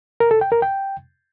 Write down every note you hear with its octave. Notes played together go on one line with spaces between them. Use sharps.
A#4
A4
G5
A#4
G5